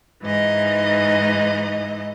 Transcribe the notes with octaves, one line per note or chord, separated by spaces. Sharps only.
G#2 E3 D#4 D#5